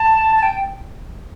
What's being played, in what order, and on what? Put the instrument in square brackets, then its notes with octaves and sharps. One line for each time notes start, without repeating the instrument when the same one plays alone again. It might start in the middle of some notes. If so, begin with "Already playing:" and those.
Already playing: [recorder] A5
A5
G5